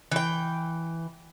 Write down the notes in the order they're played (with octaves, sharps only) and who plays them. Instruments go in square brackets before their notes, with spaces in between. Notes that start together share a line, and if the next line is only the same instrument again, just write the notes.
[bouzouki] E3 G5